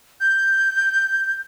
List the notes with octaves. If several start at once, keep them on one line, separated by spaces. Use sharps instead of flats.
G6